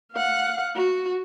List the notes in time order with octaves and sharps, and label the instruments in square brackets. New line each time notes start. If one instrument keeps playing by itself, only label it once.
[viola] F5 F#5
F#4